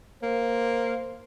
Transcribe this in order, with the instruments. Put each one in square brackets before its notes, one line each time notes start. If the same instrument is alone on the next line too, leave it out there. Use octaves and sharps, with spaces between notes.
[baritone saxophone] A#3 [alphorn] C5